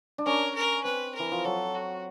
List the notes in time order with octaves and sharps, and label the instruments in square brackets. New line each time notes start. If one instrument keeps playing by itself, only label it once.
[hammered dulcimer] D4
[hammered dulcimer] C#4 [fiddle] A#4
[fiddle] A#4
[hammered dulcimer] C4 [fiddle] B4
[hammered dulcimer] E3 [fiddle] A#4
[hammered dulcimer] F3
[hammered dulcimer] F#3 [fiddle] A4
[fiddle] F#4